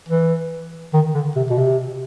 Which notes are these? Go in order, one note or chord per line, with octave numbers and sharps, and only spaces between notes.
E3
D#3
D3
C3
B2
C3